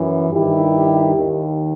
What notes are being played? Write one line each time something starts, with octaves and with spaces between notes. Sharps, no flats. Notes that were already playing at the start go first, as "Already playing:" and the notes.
Already playing: F#2 E3
G2 D#3 E4 G4
D#2 D#3